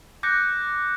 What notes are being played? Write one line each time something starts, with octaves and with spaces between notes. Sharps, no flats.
D6 F#6 G6 A#6 C#7